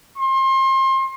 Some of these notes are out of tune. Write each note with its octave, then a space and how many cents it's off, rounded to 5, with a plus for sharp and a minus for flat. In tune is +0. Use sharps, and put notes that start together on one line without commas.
C6 +30